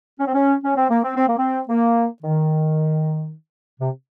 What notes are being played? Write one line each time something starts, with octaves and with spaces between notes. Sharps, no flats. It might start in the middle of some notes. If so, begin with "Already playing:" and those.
C#4
C4
C#4
C#4
C4
A#3
C4
C4
A#3
C4
A#3
D#3
C3